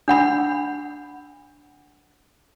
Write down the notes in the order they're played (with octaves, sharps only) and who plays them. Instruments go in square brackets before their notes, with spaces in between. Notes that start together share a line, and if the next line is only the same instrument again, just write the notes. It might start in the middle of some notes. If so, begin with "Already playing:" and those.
[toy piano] D4 F#5 B5